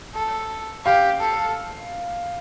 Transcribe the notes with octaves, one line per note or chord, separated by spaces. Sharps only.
A4
G4 F5
A4